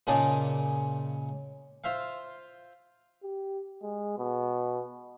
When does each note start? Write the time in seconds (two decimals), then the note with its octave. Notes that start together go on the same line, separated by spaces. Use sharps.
0.07 A#2 C#3 D#4 G#4 A5 D6
1.84 F4 C5 E5 F5
3.23 G4
3.83 G#3
4.18 B2